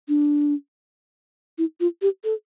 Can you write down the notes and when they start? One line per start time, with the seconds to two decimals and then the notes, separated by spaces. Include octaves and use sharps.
0.09 D4
1.58 E4
1.80 F4
2.02 G4
2.24 A4